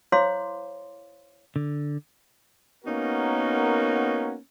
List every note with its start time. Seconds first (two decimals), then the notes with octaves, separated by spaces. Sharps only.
0.12 E4 C5 C#5 F5 C6 D6
1.56 D3
2.85 A#3 B3 C#4 D#4 F#4 A#4